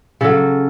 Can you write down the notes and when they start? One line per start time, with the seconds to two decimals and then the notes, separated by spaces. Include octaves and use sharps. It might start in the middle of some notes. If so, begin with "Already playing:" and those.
0.21 C#3 F#3 A4